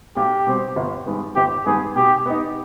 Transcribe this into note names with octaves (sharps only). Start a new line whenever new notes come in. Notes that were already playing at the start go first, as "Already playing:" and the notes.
B1 G4
B2 G3 C4
G1
G2 D#3 G#3 B3
G1 G4
G2 D#3 G#3 B3 G#4
B2 G4
B3 D#4